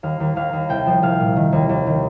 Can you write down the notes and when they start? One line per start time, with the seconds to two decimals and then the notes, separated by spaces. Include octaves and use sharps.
0.03 D#2 F5
0.20 D#2
0.36 D#2 F5
0.53 D#2
0.69 C2 G5
0.86 F3
1.02 C2 F5
1.20 A#2
1.36 D#3
1.52 D#2
1.69 D#2
1.86 D#3